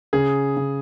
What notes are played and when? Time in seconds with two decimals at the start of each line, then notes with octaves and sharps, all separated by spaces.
0.13 C#3 G#4
0.57 C#3